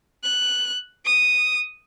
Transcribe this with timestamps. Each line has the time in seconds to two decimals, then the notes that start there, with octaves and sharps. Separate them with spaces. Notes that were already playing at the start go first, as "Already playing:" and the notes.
0.23 F#6
1.05 D#6